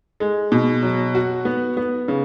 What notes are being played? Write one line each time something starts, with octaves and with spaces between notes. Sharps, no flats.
G#3
B2
F#3
F#4
B3
B3
C#3